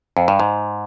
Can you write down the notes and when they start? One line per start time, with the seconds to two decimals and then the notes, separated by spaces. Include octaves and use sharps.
0.17 F2
0.28 G2
0.40 G#2